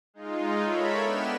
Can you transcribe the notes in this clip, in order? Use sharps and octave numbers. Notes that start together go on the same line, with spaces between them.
G#3 D#4 F4
A4 A#4 C#5 E5 B5
B3 D4 B4 G5 F6 E7